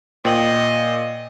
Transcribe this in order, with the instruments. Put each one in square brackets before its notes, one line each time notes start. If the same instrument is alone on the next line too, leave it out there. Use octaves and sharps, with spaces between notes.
[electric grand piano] A#2 [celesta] C5 G5 F#7 [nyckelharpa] D#5